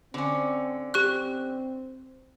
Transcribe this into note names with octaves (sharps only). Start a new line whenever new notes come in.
D3 C4 C#4
C4 G4 C#6 F#6